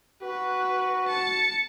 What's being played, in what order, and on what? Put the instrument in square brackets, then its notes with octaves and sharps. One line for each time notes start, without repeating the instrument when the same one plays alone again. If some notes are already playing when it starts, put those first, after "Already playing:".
[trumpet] F#4 [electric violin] B4
[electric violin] A5 C#7